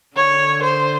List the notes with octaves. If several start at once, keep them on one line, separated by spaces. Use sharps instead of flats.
D3 C#5
C5